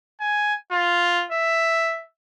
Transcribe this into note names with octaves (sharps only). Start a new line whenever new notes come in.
G#5
F4
E5